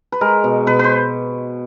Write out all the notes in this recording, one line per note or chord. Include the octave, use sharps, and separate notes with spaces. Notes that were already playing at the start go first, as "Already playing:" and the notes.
B4
G#3 A#4
B2
B2 B4
B4 C5